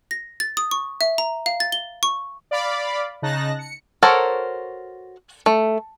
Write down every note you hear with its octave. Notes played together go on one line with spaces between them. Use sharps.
A#6
A6
D#6
C#6
E5
A#5
F5
A6
G7
C#6
D5 F5 B5 D6
C#3 D#4 A5 F#6 A#6
C#7
F#4 A4 A#4 C5 C#5
A3